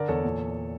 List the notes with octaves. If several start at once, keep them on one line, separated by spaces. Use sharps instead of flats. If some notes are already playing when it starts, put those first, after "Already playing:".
Already playing: D3 A#4 D5
E2 A4 C#5
A#2